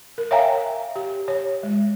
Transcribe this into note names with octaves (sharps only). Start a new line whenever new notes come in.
A#4
C#5 E5 F5 G5 G#5 A#5
G4
C#5
G#3